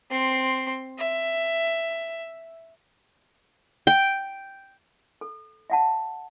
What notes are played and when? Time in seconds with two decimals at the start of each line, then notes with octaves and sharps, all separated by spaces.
0.11 C4 C6
0.98 E5
3.87 G5
5.21 A4
5.70 E5 F#5 A5